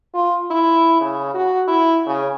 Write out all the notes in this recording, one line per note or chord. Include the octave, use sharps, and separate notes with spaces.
F4
E4
C#3
F#4
E4
C#3